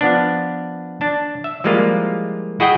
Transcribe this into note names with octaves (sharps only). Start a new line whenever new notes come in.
F3 B3 D4
D4 A5
E5
F3 G3 G#3 A#3 E4 F4
E4 F#4 G#4 D#5 E5 G5